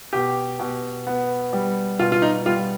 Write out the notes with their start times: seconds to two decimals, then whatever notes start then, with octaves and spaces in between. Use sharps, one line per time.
0.13 B2 G4
0.59 B2
1.07 B3
1.53 G3
1.99 B2 F4
2.12 F4
2.22 D#4
2.46 G3 F4